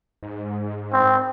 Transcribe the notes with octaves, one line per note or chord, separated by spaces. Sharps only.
G#2
C4